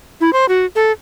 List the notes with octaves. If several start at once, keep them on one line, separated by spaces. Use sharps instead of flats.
E4
C5
F#4
A4